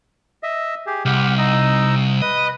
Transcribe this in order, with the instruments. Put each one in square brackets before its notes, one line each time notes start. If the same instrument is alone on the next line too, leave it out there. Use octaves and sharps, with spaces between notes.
[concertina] D#5 E5
G4 G#4
[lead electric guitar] C2 [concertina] G4 F#5 F6
[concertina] D#4 D#5 E6
[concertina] B4 [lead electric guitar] D#5